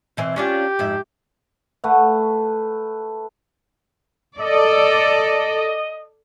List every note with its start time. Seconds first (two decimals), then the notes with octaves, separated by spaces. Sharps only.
0.17 B2 E3 C4
0.36 C#4 D4 F4 G4
0.79 F2 G#2 E4
1.84 A3 B4 F#5
4.39 A4 D5 D#5